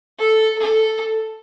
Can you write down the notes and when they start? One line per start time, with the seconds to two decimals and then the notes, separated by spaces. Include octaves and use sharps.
0.19 A4
0.58 A4